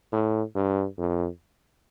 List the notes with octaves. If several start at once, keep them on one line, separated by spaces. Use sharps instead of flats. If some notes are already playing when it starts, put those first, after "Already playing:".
A2
G2
F2